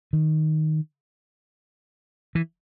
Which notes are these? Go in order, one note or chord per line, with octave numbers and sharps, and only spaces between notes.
D#3
E3